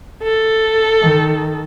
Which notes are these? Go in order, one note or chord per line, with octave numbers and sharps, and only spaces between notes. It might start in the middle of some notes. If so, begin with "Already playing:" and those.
A4
D#3